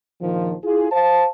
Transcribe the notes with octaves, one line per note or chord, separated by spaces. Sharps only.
A#1 D#3 F3
E4 F4 G#4
C5 F5 A5